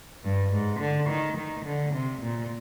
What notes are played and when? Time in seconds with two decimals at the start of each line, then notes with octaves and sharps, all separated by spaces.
0.24 G2
0.53 G#2
0.80 D3
1.09 D#3
1.37 D#3
1.66 D3
1.95 C3
2.23 A#2